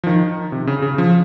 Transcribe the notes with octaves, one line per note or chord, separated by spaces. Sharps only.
F3
D#3
C3
C#3
C#3
F3